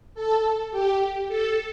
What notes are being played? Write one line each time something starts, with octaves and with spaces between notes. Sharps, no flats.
A4
G4
A4